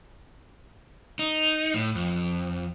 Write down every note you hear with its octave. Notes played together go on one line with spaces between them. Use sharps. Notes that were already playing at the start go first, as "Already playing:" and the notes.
D#4
A2
F2